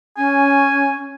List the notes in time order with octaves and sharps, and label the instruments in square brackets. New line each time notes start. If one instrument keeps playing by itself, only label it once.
[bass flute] C#4 [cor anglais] G#5